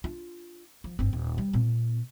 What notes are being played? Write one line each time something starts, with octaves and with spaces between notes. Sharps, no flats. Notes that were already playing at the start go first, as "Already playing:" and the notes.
D4 F4
F3
G1 C4
D#1
G3
A#2 C4